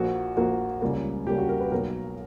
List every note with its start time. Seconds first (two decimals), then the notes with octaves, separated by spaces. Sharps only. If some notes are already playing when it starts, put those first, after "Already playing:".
Already playing: A#1 A#2 A#3 F#4
0.37 A#1 A#2 A#3 F#4
0.82 C#2 C#3 G3 A#3
1.26 C#2 C#3 G3 A#3 G4
1.38 F#4
1.49 A#4
1.60 B4
1.71 B1 B2 F#3 A#3 A#4